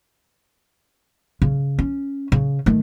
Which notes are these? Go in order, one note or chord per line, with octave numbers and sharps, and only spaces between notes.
C#3
C#4
C#3
D#3 A3